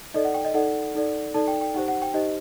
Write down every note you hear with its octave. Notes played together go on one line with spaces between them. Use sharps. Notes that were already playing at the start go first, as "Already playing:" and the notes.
D#4 A4 D5 D#5
F#5
G5
D#5
D#4 A4 D5 F#5
D#4 A4 D5
D#4 A4 D5 A5
G5
G5
D#4 G4 C5 F#5
F#5
G5
D#4 G4 C5 D#5